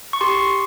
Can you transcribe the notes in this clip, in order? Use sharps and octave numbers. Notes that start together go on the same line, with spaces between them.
C#6
G4 C6